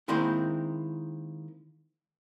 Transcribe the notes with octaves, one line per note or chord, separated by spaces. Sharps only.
D#3 G#3 A#3 C4 E4